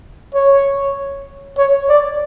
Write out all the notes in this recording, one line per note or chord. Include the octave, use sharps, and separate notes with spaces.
C#5
C#5
D5